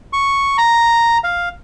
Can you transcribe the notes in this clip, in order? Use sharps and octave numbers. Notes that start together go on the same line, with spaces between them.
C#6
A#5
F5